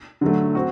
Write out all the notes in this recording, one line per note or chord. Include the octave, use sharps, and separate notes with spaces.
D3 F#3 A3
C4 F#4